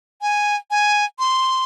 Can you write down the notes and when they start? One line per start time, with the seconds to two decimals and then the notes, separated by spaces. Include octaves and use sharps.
0.22 G#5
0.71 G#5
1.19 C6